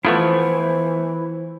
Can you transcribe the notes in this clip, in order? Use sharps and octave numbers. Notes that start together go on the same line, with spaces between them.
E3 F3 A3 B3 E4 C5 C#6